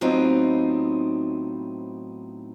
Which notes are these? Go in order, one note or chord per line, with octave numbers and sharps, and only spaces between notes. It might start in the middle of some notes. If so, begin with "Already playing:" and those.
A2 F#3 B3 C4 D#4 F4